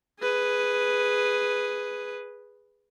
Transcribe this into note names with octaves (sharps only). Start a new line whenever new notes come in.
G#4 B4